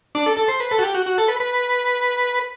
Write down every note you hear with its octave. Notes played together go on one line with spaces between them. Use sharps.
D4
A4
A4
C5
B4
A4
F#4
G4
F#4
F#4
A4
B4
B4